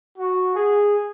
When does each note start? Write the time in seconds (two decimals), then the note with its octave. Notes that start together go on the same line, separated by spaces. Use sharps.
0.18 F#4
0.55 G#4